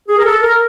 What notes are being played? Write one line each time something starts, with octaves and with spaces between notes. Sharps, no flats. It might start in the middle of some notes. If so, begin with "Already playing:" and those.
G#4
A#4
A4
A#4